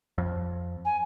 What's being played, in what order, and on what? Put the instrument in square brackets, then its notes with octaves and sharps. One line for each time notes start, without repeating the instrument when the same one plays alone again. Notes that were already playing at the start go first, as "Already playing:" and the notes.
[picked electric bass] F2
[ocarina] G#5